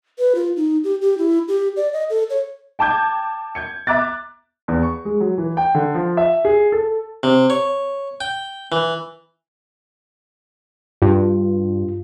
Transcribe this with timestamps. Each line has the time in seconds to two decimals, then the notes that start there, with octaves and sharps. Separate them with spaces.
0.19 B4
0.35 F4
0.56 D#4
0.84 G4
1.02 G4
1.18 E4
1.48 G4
1.76 D5
1.93 D#5
2.10 A4
2.30 C#5
2.79 G5 A5 D6 G6 G#6
3.55 G6 G#6 C#7
3.87 E5 A#5 D6 F#6 A6
4.68 E2
4.83 C#6
5.05 G#3
5.20 F#3
5.38 E3
5.57 G5
5.75 D3
5.94 F3
6.17 E5
6.45 G#4
6.72 A4
7.23 C3
7.50 C#5
8.21 G5
8.72 E3
11.02 G2 F4